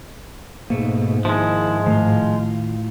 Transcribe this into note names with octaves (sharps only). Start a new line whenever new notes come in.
G#2 B2 A3 A#3
D#3 F3 G#3 E4
A2 D#3 A3 F4